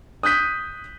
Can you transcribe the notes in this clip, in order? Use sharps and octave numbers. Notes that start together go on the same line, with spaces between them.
D#6 F#6 G6 B6 D#7